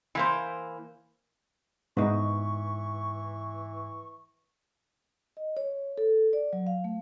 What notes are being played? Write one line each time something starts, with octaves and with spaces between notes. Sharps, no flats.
E3 A#3 C5
G#2 E3 B3 D#4 C#6
D#5
C#5
A4
D5
F#3
F5
A3